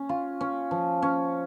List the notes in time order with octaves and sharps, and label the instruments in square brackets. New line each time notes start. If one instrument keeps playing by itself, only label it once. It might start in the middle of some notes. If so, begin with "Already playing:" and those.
Already playing: [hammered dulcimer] C#4
F4
C#4
F3
C#4